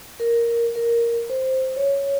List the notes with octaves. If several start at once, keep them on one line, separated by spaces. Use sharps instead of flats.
A#4
A#4
C5
C#5